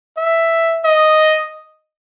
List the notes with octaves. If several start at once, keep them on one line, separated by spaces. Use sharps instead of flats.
E5
D#5